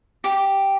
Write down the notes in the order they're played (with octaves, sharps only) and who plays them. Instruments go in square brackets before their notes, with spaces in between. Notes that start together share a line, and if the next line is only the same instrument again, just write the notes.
[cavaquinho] G4